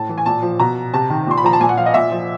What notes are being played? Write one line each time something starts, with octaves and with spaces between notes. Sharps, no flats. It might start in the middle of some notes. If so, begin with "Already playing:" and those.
Already playing: A2 A5
E3
G#5
A#2 A5
F3
B2 A#5
C3 A5
D#3
A#2 C6
B5
F3 A#5
A5
A#2 G#5
F#5
F3 F5
D#5
A#2 E5
F3